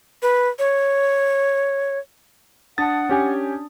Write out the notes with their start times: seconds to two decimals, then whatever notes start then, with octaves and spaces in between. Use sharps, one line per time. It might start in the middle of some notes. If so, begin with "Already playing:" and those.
0.22 B4
0.59 C#5
2.78 D4 F#5 A5 D#6 A6
3.09 C#4 G4 G#5